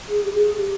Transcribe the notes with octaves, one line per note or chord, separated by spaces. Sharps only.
G#4
G4
G#4
G4